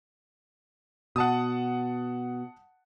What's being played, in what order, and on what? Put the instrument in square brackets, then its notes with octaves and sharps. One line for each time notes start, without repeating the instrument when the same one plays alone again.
[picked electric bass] B2 [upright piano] F#5 A5 D#6